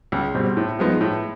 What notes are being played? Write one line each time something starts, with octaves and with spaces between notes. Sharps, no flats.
C#2
B2 G3 C4
A2
F3 G#3 B3 D#4
A2